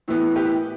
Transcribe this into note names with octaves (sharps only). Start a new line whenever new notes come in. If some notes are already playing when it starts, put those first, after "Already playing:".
A2 E3 B3
G4 B4